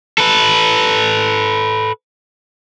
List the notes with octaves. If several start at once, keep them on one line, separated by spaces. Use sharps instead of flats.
A4 B4